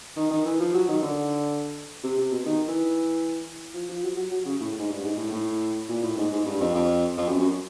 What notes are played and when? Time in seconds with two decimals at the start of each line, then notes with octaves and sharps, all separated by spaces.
0.16 D#3
0.31 D#3
0.45 E3
0.60 F3
0.74 F#3
0.88 D#3
1.03 D3
2.03 C3
2.17 C3
2.31 B2
2.45 D#3
2.68 E3
3.74 F3
3.89 F3
4.03 F#3
4.17 F#3
4.32 F#3
4.45 C#3
4.60 A2
4.79 G#2
4.89 G2
5.04 G#2
5.17 A2
5.32 A2
5.89 A#2
6.03 A2
6.18 G#2
6.33 G#2
6.46 G2
6.61 F2
6.74 F2
7.18 F2
7.28 F#2
7.39 F#2